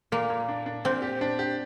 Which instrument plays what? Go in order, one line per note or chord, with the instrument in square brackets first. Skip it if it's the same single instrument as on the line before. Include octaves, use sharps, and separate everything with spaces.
[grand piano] A#2 [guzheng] A#3
[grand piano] A#2
D4
D4
[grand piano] A#2 [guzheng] C4
[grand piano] G4
D4
G4